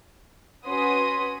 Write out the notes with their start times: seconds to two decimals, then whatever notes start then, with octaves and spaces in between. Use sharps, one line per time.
0.66 C#4 F#4 B4 G#5 C6 D#6